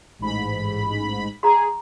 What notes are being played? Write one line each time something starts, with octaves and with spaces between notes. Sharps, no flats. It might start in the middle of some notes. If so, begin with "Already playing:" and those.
A1 G#2 B5
G#4 A#5 C6